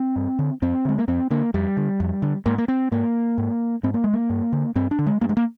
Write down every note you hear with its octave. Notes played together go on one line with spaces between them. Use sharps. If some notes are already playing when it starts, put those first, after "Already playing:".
Already playing: C4
G2
D3
F2 C4
D3 G#3
A#3
F2 C4
D3 A#3
F2 G3
D3
F2
D3
G#2 A#3
A#3
C4
G#2 A#3
G#2
G#2 C4
A#3
G#3
A#3
G2
D3
G2 C4
D4
D3
G#3
G2 A#3
G#3
A#3